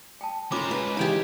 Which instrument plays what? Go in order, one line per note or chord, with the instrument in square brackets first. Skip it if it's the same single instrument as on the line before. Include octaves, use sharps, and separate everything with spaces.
[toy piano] G5 A5
[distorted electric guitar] G#3 C5 [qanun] C#4 A#4 [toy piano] F4 D6
[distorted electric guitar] C#2 [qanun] B4
[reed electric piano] C#3 E3 D#4 [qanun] G4 G5 G#5